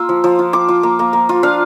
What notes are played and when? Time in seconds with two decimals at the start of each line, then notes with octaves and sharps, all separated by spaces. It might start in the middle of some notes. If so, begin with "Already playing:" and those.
Already playing: A#3 F4 E6
0.09 F3
0.24 F3
0.39 F4
0.53 F4 D6
0.69 F4
0.83 A#3
0.99 A#3
1.13 A#3
1.29 F4
1.43 D4 F5